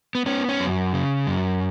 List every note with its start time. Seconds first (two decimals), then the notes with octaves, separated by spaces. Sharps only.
0.15 B3
0.26 B3 C#4
0.49 C#4
0.60 F#2
0.93 C#3
1.27 F#2